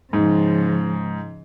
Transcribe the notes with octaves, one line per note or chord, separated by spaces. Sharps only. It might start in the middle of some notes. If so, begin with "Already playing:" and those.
G#2 C#3 F3